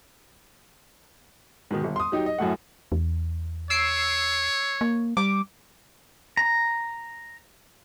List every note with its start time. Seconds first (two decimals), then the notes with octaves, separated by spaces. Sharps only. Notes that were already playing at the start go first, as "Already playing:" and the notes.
1.71 G#2 B2 D#3
1.84 G1
1.96 C6 D#6
2.12 F#3 D#4 G4
2.26 D#5
2.38 F#2 A2 A3 F#5
2.92 E2
3.70 C#5 E6 C7 D7
4.81 A#3
5.17 G3 D6
6.37 A#5